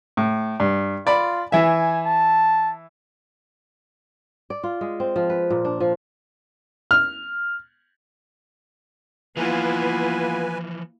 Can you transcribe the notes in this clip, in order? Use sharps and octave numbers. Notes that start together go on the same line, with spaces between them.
A2
G2
F4 D5 B5
E3 E5 G#5
A5
D5
F4
G#3
C4
F3
B4
A#2
D4
F3
F6
E3 F3 A#3 B3 E4 F4 B4 G#5